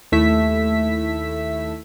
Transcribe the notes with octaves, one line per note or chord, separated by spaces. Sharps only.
D#2 A3 E4 E5 B6